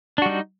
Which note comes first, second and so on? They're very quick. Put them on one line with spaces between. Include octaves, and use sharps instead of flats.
D4 F#4 G3 D#4